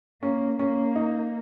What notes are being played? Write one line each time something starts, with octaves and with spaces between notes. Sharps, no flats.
A#3 C#4
A#3 C#4
D#4